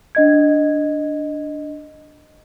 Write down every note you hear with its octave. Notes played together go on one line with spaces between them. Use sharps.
D4 D#5 G#6